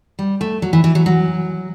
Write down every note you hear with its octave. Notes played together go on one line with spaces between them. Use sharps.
G3
A3
F#3
E3
E3
F#3
F#3